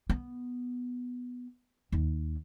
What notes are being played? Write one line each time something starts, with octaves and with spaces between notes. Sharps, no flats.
B3
D#2